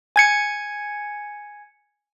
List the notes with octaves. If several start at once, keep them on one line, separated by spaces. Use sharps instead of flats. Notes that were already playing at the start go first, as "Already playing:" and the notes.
G#5 G#6 C#7